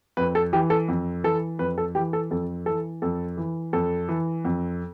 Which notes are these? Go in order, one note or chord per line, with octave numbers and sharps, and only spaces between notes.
F2 B4
A4
E3 G4
A4
F2
E3 A4
F2 B4
A4
E3 G4
A4
F2 A4
E3 A4
F2 A4
E3
F2 A4
E3
F2